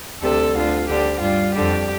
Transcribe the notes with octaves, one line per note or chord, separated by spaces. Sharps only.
D2 C3 G3 A4
D2 D3 G3 F4
D2 D3 G3 G4
G2 G3 F4
F2 D3 G3 G4